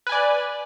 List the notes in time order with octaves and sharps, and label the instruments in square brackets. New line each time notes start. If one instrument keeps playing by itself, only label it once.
[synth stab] B4
G#5
D5